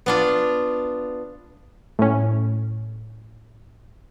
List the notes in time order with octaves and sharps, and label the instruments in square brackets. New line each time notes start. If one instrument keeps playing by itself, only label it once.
[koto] B3 D4 F4
[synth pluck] A2 C#4